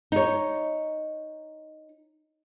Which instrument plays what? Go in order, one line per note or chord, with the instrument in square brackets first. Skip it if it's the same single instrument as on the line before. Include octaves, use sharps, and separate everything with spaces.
[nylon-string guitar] D#4 C#5